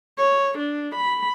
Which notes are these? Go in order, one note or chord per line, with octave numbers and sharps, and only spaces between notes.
C#5
D4
B5